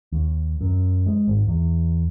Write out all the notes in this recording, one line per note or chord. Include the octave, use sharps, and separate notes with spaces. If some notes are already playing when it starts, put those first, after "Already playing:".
D#2
F#2
G#3
G#1
E2